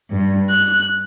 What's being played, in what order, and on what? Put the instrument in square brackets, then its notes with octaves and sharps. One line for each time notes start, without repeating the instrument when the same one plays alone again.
[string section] G2
[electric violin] F#6